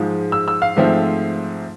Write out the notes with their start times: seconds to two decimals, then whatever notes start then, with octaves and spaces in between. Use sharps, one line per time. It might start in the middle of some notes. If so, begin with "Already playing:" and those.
Already playing: G#2 F3 G#3
0.32 E6
0.48 E6
0.62 F5
0.77 G#2 F3 A3 C4